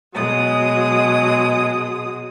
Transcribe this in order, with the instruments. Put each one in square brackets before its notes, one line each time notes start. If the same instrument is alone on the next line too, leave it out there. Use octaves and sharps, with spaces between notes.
[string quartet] B2 F#3 G#3 D#6